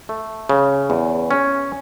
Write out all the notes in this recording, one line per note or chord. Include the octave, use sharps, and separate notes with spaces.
A3
C#3
E2
C#4